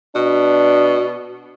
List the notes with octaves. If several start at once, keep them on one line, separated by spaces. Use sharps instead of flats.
B2 D4